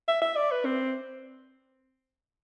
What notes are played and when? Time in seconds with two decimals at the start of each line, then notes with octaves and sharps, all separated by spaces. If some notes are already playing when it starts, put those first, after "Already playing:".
0.08 E5
0.22 E5
0.36 D5
0.51 B4
0.65 C4